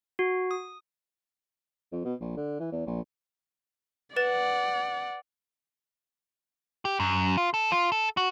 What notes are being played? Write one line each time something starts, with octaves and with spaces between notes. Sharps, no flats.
F#4
D#6
F2
B2
A#1
D3
E3
E2
A#1
B4 D5 F#5 A6 E7
G4
F#2
F4
A4
F4
A4
F#4